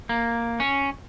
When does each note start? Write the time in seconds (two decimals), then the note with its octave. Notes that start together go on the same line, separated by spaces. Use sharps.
0.09 A#3
0.60 C#4